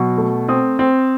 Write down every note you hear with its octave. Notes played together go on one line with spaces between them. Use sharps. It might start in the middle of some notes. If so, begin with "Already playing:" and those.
Already playing: B2 F#3
A3
C4 D#6
C4